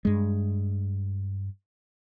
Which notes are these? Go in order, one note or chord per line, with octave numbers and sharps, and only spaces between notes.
G2 G#3